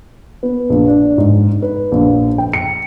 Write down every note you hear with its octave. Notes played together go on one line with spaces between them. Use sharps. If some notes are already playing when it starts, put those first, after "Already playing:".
B3
A#1
D4
G#2
B4
A#1
G5
C#7